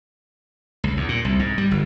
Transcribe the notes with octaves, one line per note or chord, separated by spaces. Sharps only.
C#2
E2
A#2
C2
G#2
G3
G1